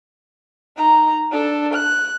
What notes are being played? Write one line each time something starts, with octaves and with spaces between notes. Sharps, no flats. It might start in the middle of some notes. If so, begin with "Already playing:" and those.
D#4 A#5
D4 A4
F#6